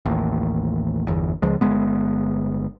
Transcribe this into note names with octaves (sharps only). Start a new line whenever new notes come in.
A1 D#2
G1 E2
C#2 F3 G#3
G1 G#3 B3